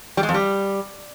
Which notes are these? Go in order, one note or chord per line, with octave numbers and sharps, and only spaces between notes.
G3
G#3
F2
G3